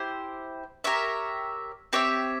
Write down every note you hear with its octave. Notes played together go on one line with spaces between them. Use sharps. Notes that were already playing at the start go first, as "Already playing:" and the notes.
Already playing: E4 G4 C5
G4 A#4 C#5 E5
C4 G4 C#5 E5